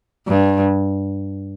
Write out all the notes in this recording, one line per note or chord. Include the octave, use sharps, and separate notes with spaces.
G2